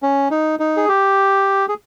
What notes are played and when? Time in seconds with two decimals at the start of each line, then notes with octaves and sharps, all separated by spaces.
0.03 C#4
0.31 D#4
0.59 D#4
0.77 G#4
0.88 G4
1.69 G#4